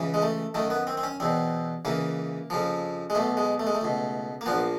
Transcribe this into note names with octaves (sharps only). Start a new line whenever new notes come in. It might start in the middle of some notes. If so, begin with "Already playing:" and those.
Already playing: C#2 C#3 E3
G#3
A3
F#2 D#3 A3
B3
C4
C4
C#4
E2 B2 C4
C#2 C#3 E3 A#3
F2 C#3 F3
G#3
B1 B2 A3
G#3
A3
G#3
A3
C#2 B2
A#3
A#1 A#2 F3 B3